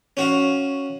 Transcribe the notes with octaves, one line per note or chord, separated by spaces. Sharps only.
C#4 F#4 F5